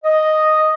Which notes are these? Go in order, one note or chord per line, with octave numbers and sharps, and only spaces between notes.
D#5